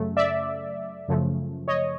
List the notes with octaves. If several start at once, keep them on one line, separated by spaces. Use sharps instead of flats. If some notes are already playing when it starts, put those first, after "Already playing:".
Already playing: F#2 C#3 F#3 A3
D5 E5
F#2 C#3 F3 A3
C#5 D#5